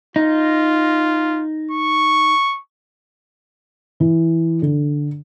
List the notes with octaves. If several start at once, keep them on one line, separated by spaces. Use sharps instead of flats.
D#4 F4
C#6
E3
D3